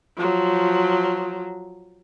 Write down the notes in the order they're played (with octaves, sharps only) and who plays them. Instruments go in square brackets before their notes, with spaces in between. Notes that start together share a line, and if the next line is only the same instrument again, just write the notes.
[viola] F3 F#3